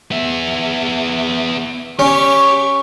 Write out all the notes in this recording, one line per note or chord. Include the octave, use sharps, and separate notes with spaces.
B3 E5
C#4 G4 C#6